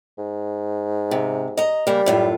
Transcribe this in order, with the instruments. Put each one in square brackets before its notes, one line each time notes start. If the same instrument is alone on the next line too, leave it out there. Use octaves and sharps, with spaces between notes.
[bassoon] G#2
[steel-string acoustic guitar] C3
D#5 A#5
[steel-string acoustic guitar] C#3 A#3 [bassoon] G3
[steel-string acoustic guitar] F#2 A2 F4